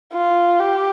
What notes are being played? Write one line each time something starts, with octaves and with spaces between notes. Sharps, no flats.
F4
G4